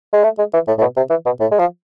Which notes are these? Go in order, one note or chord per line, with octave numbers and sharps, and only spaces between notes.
G#3
A3
G#3
E3
A2
A2
B2
C3
E3
B2
A2
G#3
F3